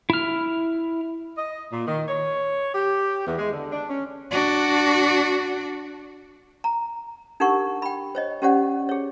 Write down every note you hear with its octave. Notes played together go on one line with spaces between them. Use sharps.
E4 F6
D#5
A#2
D#3
C#5
G4
E2
G#3
D3
D4
C#4
D4 F#4
A#5
D4 D#4 G4 A#4 F#5 C#6
G5 B5
C5 C#5 D#5
C#4 G4 C5 D5 F#5
G#4 C#5